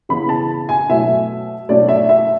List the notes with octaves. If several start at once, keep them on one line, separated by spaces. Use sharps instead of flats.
C#3 E3 B3 B5
A5
G#5
B2 F#3 A3 E5
B2 F#3 A3 C#4 D5
E5
E5